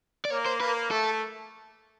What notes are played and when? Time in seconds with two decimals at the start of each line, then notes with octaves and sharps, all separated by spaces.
0.25 D5
0.30 A#3 C#5
0.46 C5
0.60 A#3 B4
0.91 A3 A4